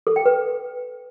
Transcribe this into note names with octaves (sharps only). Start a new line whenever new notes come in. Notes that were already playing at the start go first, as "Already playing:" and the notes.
A4
G5
B4